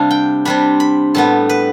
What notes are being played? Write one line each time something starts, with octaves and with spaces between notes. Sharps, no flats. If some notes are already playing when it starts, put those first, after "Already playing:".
Already playing: C3 G3 D4 F5
G5
C3 G3 D4 B5
B5
A2 G3 B3 A5
B4